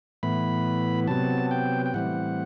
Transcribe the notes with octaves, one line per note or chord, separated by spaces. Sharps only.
A2 E3 B3 B5
C3 F#3 B3 A5
G5
G5
A2 E3 G3 C4 F#5